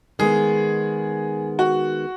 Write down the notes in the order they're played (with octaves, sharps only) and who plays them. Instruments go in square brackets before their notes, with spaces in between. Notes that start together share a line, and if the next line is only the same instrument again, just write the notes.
[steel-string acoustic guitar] D#3 G#3 B3 [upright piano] G#4
[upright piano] F#4